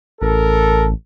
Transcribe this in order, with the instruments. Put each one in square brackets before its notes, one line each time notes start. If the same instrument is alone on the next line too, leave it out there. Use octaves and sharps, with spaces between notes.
[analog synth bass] A1 [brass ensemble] A4 A#4